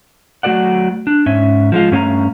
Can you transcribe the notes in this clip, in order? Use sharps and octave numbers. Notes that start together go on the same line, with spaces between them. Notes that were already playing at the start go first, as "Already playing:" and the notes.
F#3 A3 F#4 A4 D5 F#5
D4
G#2 C#4 E5
F3 G#3 F4
G2 A3 C#4 D#4 F5 A#5